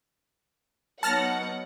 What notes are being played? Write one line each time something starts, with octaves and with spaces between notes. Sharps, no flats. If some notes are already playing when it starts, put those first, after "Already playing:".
F#3 B3 D#4 F#5 A5 F6 A#6